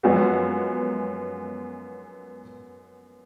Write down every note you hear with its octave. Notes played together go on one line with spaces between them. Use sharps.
F#2 F3 G#3 B3 F#4